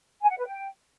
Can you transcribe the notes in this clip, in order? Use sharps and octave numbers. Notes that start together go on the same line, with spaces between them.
G#5
F#5
B4
G5